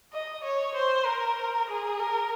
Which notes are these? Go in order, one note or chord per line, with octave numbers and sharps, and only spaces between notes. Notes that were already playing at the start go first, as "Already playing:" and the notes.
D#5
C#5
C5
A#4
G#4
A#4